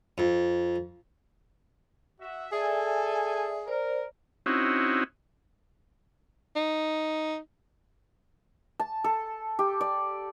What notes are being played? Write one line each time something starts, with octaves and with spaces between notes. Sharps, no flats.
F2
F#4 E5
G#4 A4 D5 E5 G#5
A#4 C5 D5
C4 C#4 D#4 E4 F#4
D#4
A5
A4
G4
D5